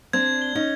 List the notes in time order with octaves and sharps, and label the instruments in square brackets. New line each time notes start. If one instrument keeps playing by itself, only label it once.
[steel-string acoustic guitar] C4 D4 [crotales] G#6
[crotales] G7
[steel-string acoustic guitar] C#4 D#4